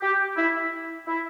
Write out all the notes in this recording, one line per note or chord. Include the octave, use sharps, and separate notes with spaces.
G4
E4
E4